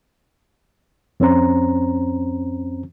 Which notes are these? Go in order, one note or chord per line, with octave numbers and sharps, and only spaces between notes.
F2 C4 C#4 C5 A#5